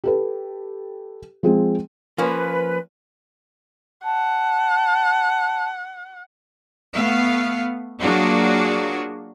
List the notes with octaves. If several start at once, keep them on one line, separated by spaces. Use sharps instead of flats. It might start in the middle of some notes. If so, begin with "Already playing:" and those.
G4 A4 B4
F3 G#3 C4 G#4
F3 A#3 C#4 B4
F#5 A5
A3 B3 F5
F#3 A#3 D4 F4 F#4 G#4